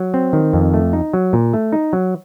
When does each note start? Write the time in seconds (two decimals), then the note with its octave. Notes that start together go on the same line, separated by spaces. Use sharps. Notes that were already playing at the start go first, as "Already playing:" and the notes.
Already playing: F#3
0.14 C4
0.33 D#3
0.53 F2
0.74 A3
0.93 D#4
1.13 F#3
1.33 A#2
1.54 A3
1.72 D#4
1.93 F#3